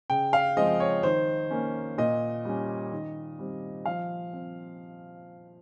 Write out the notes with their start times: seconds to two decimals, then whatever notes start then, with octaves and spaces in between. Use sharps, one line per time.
0.10 C#3 G5
0.33 F5
0.57 F3 G#3 C4 D#5
0.80 C#5
1.03 D#3 C5
1.51 A#3 C#4
1.98 A#2 D#5
2.45 G3 C#4
2.92 D#3
3.39 G3 C4
3.86 F3 F5
4.33 C4